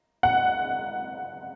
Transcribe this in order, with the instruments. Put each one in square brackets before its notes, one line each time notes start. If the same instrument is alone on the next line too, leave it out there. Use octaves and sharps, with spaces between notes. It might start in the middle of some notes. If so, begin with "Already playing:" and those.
[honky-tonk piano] F#5